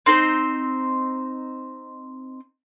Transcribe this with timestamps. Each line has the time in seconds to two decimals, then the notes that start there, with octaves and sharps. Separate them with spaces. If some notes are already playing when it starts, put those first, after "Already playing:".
0.06 C4 D#4 C5